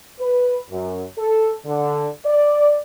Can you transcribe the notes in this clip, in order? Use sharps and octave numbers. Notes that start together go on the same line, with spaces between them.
B4
F#2
A4
D3
D5